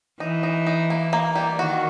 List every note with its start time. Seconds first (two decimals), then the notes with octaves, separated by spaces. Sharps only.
0.20 E3 D#4
0.43 D#4
0.66 D#4
0.90 A#3
1.13 A#3
1.35 G3
1.59 D#3 F#4